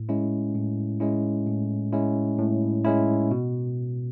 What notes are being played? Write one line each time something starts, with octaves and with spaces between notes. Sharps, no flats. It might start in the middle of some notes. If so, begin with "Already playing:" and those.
Already playing: A2
G#3 C#4 E4
A2
G#3 C#4 E4
A2
G#3 C#4 E4
A2
G#3 C#4 E4
B2